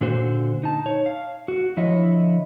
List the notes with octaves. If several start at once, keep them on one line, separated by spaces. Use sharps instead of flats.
A#2 D3 F#4 C5
D#4 A5
C#5
F5
F#4
D3 F3 E4 C#5 D#5